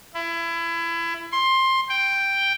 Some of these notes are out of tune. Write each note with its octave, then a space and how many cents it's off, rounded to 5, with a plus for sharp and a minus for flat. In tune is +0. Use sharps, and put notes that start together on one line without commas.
E4 +25
C6 +15
G5 +0